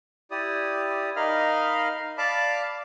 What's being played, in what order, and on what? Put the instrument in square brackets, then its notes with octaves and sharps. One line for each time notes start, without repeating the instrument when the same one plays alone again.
[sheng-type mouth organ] E4 G4 D5 D#6
D#4 A#4 D#5 F5 B5 F6
D5 F5 A5 B5 D6